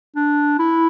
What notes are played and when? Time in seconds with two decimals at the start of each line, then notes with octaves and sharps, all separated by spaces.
0.16 D4
0.59 E4